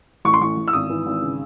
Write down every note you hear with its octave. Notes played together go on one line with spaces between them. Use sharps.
A1 C#6
C6
A1 C#6
A1
E6
G#1 D#6
E3
G#1
C#3